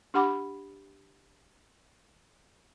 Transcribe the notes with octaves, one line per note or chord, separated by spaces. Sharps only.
D4 G4 F#5 B5 D6